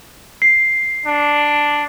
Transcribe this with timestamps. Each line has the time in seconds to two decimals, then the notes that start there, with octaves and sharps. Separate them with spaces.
0.42 C7
1.06 D4